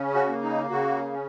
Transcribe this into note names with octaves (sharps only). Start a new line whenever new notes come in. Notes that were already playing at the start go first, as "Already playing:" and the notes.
Already playing: C#3 C#4
F#4
A#3
D#4
C#3 F#4
C#4